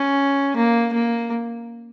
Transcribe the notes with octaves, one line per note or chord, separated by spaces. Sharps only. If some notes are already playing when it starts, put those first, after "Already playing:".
Already playing: C#4
A#3
A#3